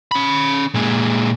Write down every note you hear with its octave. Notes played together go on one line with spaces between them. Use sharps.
C#4 B5
A#2 G#3